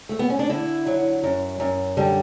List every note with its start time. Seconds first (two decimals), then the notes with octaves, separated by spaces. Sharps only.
0.09 A3
0.19 B3
0.30 C#4
0.39 D4
0.50 D3 E4
0.87 F#3
1.24 F#2
1.60 F#2
1.97 D3 G3